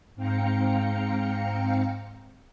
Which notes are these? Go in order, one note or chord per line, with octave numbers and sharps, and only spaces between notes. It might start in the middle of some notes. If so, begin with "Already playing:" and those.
G#2 C4 F5 G5 A#5 C#7